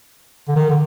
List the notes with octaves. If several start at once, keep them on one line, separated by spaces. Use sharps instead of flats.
D3
D#3
D3